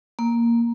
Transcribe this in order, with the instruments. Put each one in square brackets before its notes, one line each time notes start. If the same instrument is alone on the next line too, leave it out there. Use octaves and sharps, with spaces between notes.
[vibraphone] A#3